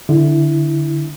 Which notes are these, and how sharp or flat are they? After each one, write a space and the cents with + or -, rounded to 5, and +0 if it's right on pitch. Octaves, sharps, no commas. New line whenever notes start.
D3 +0 E4 +0